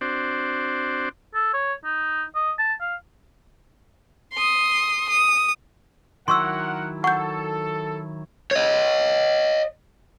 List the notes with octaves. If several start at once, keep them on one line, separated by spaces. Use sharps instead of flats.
C4 D4 F#4 C5 D5
A4
C#5
D#4
D#5
A5
F5
C6 D#6
D#6
D#3 F#3 E4 A#4 F#5 C6 C#6 E6
A4 F#5 C#6 G6
C#5 D#5